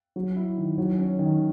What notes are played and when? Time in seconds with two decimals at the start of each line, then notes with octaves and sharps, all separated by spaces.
0.16 F#3
0.36 E4
0.58 D#3
0.78 F#3
0.99 C#4
1.19 D#3